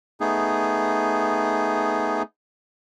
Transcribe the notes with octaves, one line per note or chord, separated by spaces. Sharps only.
A3 B3 D#4 G#4